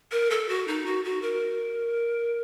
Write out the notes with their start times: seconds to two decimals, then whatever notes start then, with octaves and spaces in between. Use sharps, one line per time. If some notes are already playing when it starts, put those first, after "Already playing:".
0.12 A#4
0.30 A4
0.49 F#4
0.68 D#4
0.86 F#4
1.04 F#4
1.22 A#4